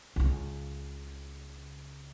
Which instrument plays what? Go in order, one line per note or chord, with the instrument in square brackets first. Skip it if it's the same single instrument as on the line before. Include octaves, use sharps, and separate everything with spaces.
[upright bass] C#2 C#3